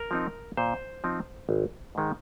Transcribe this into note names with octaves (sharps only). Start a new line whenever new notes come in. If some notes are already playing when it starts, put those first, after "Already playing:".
Already playing: A#4
F3 C4 D#4
A#2 C5
F3 C4 D#4
G#1
G#2 D#3 G#3